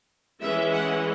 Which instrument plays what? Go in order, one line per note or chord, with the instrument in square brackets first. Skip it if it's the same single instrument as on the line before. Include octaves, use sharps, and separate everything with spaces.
[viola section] E3 G#3 C#4 E5
F#5